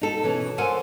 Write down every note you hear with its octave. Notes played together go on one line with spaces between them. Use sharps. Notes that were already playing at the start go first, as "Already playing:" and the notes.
D#4 A4
B2 E3 C#4
A4 A#4 C5 F#5 G#5